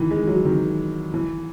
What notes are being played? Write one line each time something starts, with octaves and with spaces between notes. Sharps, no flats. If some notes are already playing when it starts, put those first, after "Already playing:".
Already playing: D#3 E3
G#3
F#3
D#3
E3